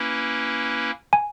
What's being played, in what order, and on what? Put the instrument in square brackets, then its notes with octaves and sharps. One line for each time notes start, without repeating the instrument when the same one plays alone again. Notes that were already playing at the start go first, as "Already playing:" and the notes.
Already playing: [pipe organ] A#3 C#4 E4 B4
[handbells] G#5